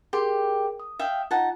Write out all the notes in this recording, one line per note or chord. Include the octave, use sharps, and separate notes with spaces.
G4 G#4 A#4 G5 C6
D#6
E5 F5 G5
D#4 F4 F#5 A5